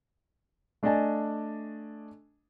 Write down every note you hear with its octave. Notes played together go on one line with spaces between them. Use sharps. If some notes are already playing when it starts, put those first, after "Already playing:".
A3 D4 D5 D#5 G#5 A5